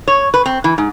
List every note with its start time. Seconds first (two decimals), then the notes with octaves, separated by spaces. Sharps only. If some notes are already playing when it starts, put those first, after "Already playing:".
0.08 C#5
0.34 B4
0.46 C4
0.64 E3
0.78 G#2